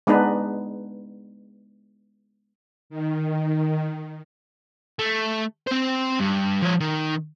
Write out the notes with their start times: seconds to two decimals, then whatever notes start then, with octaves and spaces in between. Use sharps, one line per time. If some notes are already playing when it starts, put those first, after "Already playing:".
0.07 G#3 B3 D4 D#4 B4
2.90 D#3
4.99 A3
5.67 C4 C5
6.20 G2
6.62 F3 C#5
6.80 D#3